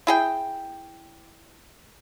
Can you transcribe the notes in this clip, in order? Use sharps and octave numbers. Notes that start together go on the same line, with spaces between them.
E4 G#4 G5